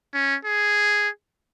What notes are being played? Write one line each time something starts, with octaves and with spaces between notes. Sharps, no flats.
C#4
G#4